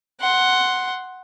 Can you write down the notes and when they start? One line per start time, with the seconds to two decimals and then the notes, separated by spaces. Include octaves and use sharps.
0.20 F#5 C6